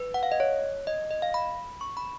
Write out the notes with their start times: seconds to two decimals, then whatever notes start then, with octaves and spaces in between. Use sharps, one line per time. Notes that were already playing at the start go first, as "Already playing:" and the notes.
Already playing: B4
0.14 F#5
0.23 F5
0.32 D#5
0.40 C#5
0.87 D#5
1.11 D#5
1.22 F5
1.34 B5
1.81 C#6
1.97 B5